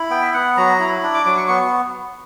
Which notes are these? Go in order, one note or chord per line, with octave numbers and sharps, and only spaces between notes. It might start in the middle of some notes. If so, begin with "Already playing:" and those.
Already playing: E4
B3 G5
E5
B3 F#5
F#3 A#5
E4
D4
D6
F#3 D6
C#6
B3 C#6